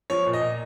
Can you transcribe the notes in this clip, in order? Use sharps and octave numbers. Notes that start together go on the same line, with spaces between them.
F3 C#5
A#2
D#5
A#2